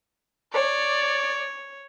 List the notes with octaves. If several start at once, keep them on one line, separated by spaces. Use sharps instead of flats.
C#5 D5